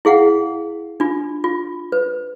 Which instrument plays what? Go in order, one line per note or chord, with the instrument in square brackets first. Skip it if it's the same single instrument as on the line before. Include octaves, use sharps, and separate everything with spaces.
[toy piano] E4 G#4 F5 F#5
D4 F4
F4
B4